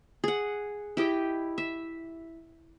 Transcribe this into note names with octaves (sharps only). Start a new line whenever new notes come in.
G#4 F#5
E4 G4 D#5 G5
E5